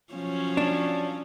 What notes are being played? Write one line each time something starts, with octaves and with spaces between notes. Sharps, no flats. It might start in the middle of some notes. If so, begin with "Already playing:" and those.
F3 F#3 C#4
D4